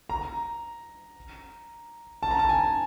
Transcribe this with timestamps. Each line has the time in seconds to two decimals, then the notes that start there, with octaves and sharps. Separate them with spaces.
0.09 A#5
2.23 A5
2.31 A#5
2.39 A5
2.49 G#5